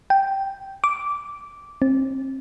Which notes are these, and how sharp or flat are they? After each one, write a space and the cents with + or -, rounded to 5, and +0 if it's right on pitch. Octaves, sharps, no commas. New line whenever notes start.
G5 -5
D6 -10
C4 +30